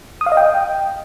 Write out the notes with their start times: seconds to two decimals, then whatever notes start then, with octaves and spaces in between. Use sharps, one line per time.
0.21 D#6
0.26 F5
0.32 D#5
0.37 G5